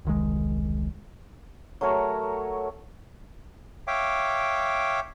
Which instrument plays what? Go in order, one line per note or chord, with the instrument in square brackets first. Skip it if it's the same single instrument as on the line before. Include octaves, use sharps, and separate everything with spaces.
[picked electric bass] E1 C2 D#3 G#3
[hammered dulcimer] F#3 A3 A#4 C#5
[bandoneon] C#5 E5 F5 G5 D6